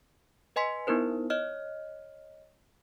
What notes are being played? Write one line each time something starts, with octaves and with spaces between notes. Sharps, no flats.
B4 D#5 G#5 C6 B6
B3 D#4 E4 A#4 C5
C#5 D#5 F6